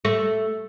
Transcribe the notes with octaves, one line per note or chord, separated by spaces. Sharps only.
A3